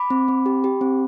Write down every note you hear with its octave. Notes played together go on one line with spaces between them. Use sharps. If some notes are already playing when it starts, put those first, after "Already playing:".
Already playing: B5 D6
C4
C4
G4
G4
C4